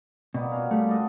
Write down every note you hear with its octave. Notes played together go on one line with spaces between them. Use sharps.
B2 G3 A#3 B3
C#4 F#4 F5
G3 A3
A4 D5 D#5